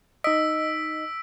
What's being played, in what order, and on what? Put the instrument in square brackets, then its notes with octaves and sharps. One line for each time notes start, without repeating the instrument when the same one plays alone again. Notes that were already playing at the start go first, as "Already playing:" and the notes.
[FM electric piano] D#4 D#5 [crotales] E6 B6 D7